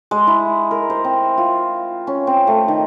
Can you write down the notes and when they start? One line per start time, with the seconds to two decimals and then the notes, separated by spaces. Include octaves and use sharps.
0.11 G#3
0.27 E4
0.71 A#4
0.90 C5
1.04 C4
1.37 F4
2.07 C#4
2.27 C4
2.47 A3
2.68 D#3